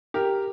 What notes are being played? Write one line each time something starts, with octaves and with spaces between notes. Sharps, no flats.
G4 A#4